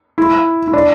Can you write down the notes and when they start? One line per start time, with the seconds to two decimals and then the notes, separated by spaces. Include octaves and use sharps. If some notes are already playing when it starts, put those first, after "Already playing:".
0.18 E4
0.68 E4
0.73 D4